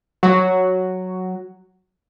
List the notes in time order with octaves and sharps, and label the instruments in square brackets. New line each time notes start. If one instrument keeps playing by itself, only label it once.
[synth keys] F#3 F#4